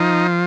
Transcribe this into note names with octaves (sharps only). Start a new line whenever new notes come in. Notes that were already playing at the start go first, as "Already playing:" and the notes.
Already playing: F3 D#4